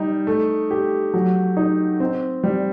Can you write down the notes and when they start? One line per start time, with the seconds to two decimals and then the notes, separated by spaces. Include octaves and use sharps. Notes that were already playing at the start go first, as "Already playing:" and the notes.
Already playing: G3 D#4
0.27 A3
0.71 G4
1.14 F#3
1.57 D#4
2.00 C4
2.44 G3